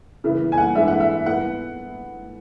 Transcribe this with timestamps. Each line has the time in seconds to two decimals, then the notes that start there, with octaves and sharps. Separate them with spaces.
0.24 C#3 E3 B3 E4
0.52 G#5
0.58 F#5
0.75 E3 G#3 D4 E5
0.88 F#5
1.00 E5
1.26 B3 E4 F#5